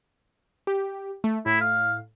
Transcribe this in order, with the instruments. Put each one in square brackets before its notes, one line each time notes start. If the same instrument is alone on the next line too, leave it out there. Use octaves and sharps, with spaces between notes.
[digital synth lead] G4
A3
[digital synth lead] A2 [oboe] E4
[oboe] F5